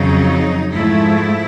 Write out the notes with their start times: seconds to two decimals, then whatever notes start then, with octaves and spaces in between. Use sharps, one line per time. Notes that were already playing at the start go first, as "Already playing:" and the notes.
Already playing: F2 C#3 F#3 D#4
0.72 G#2 F3 A3 E4